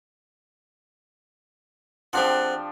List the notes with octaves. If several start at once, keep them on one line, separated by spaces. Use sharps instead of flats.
F3 C4 D4 G4 G#4 F#5